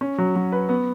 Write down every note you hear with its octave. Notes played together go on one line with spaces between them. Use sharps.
C#4
F#3
F#3
B4
B3